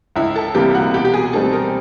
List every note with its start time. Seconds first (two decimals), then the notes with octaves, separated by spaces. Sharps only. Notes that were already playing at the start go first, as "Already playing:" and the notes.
0.16 C#2 E4
0.36 A4
0.55 C3 E3 G3 A#3 G4
0.74 F#4
0.94 B2 G4
1.05 G4
1.14 G#4
1.33 G3 C4 D#4 A4
1.53 A#4